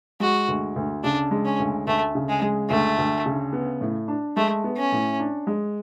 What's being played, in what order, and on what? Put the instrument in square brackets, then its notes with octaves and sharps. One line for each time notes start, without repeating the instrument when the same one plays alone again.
[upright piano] G#3 [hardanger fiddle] F#4
[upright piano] D2
D2
[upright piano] C#3 [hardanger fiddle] D4
[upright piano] G#3
[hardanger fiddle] C#4
[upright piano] D2
[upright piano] D2 [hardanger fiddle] A3
[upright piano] C#3
[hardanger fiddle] G#3
[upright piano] G#3
[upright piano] D2 [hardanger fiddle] A3
[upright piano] D2
C#3
B3
A2
D4
[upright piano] G#3 [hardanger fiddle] A3
[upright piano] B3
[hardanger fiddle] C#4
[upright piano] A2
D4
G#3